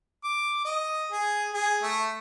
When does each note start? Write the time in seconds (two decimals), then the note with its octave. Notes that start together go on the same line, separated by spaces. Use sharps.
0.24 D6
0.65 D#5
1.11 G#4
1.54 G#4
1.83 A3